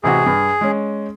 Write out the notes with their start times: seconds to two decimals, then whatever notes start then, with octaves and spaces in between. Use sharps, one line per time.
0.04 A1 C3 F#4 G#4
0.26 G2
0.61 G#3 C#4